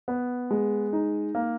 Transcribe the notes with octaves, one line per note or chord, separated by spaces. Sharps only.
B3
G#3
D#4
A#3